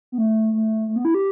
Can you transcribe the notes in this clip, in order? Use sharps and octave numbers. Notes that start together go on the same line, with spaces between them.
B3
A3
A3
A3
B3
E4
G4